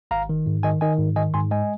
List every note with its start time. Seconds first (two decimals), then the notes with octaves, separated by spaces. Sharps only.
0.11 G#1 F5 A#5
0.29 D#3
0.46 G#2
0.63 D#3 D#5 G#5
0.81 D#3 D#5 G#5
0.99 G#2
1.16 D#3 D#5 G#5
1.34 G#2 G#5 C6
1.51 G#3 D#5 G#5